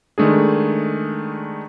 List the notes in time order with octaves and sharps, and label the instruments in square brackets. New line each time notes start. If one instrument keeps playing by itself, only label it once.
[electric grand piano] D#3 G#3 A3 D4 G#4